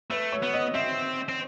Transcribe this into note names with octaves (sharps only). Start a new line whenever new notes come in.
A3 B4
C#5
B3
D#5
C4 E5
C4